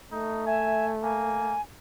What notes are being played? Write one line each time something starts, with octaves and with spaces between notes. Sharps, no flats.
A3 D#4
E5 G#5
A#3 G#5